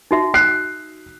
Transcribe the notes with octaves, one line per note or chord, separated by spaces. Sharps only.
D#4 F#4 E5
F#6 C7